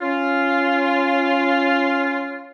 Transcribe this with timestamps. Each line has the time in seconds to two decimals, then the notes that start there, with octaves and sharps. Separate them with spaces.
0.01 C#4 F4